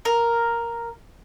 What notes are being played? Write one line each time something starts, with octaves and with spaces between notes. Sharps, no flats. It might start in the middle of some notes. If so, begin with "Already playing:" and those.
A#4